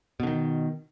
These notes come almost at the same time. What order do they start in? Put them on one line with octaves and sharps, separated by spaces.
B2 D3 D#3